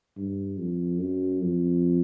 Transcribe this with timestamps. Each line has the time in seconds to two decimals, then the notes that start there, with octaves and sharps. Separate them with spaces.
0.17 G2
0.58 F2
1.00 F#2
1.42 F2